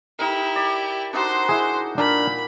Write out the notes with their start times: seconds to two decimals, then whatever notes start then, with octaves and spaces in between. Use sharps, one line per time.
0.19 D#4 E4 G4 A#4
0.56 D5
1.13 D4 D#4 F#4 C5 C6
1.49 E4 G#4
1.98 A#2 D4 A#4 B5